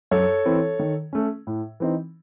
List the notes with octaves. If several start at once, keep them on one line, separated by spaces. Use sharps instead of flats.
F#2 A4 C#5
E3 C4 E4
D#3
A3 C#4
A2
E3 C4 D#4